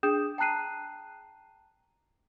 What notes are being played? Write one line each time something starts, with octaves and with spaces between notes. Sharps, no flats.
D4 G#4 G5 D#6 G6 E7
G5 A5 A#5 F#6 C7 D#7